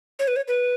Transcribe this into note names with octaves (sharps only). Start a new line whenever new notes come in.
C#5
B4
C#5
B4